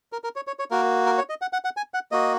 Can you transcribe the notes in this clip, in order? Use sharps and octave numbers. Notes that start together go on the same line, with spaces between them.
A#4
A#4
C#5
C#5
C#5
A#3 F#4 A#4
A#4
C#5
D#5
F#5
F#5
F#5
G#5
F#5
A#3 F#4 D#5